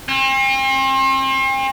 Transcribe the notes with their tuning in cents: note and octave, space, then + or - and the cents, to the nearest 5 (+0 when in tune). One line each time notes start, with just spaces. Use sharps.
C4 +40